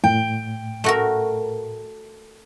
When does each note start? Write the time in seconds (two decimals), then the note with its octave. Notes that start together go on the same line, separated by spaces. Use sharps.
0.04 A2 G5
0.84 A3 F#4 A#4